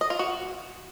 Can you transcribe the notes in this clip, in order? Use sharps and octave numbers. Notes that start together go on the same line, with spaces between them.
D#5
F4
F#4